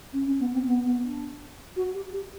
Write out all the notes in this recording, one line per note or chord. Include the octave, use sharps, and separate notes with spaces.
C#4
C#4
B3
C4
B3
B3
D4
F#4
G4
G4